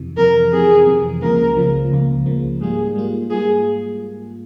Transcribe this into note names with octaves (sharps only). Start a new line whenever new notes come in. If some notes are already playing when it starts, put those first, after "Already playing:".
Already playing: F2 C3 E3
F2 C3 E3 A#4
F2 C3 E3 G#4
F2 C3 E3
C#2 C#3 F3 A#3 A#4
C#2 C#3 F3 A#3
C#2 C#3 F3 A#3
C#2 C#3 F3 A#3
G#2 G3 A#3 F4 G#4
G#2 G3 A#3 F4
G#2 G3 A#3 F4 G#4